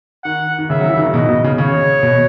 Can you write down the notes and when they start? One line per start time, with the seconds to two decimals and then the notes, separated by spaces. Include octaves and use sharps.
0.24 D#3 F#5
0.58 D#3
0.70 C#3 E5
0.80 F#3
0.89 E3
0.98 D#3
1.06 C#3
1.13 B2 D#5
1.29 B2
1.44 C#3
1.58 C#3 C#5
2.03 B2